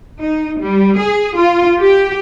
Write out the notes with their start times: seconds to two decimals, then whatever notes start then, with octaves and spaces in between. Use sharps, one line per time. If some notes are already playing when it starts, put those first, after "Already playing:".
0.19 D#4
0.58 G3
0.96 G#4
1.36 F4
1.78 G4